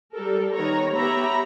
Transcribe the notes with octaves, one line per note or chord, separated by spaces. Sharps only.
G3 A4 A#4
D#3 B3 C#5 A#5
B3 G4 C#5 E5 A#5 B5